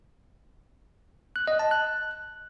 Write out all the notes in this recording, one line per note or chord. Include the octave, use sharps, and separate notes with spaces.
F#6
D#5
A5
F#6